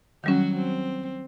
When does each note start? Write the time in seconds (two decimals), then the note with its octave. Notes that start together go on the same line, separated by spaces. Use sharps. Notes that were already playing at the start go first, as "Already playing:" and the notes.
0.24 D#3 F#3 G3 C#4 F#4
0.57 C4